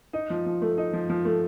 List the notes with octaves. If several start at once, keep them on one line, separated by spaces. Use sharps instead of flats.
D#4
F3
F3
A3
D#4
F3
F3
A3